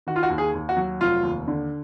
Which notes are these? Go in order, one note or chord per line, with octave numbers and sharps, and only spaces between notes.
D#3 F#4
F4
F#4
D#2
G#4
D#2
F#4
F#3
F1 F4
D#2
D3